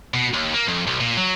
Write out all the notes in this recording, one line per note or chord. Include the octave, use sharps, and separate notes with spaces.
B2
D#2
A#3
F2
B1
A#2
F#3